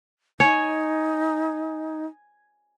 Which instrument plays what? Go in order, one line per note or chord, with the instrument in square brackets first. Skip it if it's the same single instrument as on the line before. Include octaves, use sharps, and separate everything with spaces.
[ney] D#4 [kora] C#5 [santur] G#5